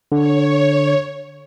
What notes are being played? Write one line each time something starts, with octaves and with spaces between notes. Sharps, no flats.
D3 C#5